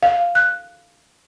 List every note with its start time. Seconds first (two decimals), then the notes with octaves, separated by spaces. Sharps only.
0.03 F5
0.35 F#6